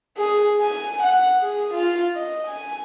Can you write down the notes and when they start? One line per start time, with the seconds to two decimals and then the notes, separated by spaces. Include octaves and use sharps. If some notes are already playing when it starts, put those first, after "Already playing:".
0.18 G#4
0.61 G#5
1.03 F#5
1.41 G#4
1.74 F4
2.15 D#5
2.47 G#5